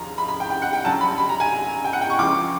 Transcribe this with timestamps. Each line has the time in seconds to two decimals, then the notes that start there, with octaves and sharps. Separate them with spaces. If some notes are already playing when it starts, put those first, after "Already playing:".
Already playing: D#2 C#3 F3 A#5
0.18 B5
0.29 B5
0.40 G5
0.50 G5
0.62 F#5
0.73 G5
0.84 D2 C#3 F#3 A5
1.01 B5
1.18 B5
1.29 A#5
1.40 G#5
1.85 G5
1.93 F#5
2.01 G5
2.10 C#6
2.19 C#2 C#3 F3 D6